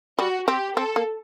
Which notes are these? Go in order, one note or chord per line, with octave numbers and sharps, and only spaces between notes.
G3 F#4
C4 G4
C4 A4
A#3